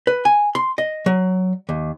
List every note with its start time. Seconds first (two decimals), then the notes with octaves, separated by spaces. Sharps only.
0.07 B4
0.25 G#5
0.55 C6
0.78 D#5
1.06 F#3
1.69 D#2